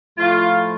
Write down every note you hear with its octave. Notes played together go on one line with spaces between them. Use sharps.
A2 F3 F4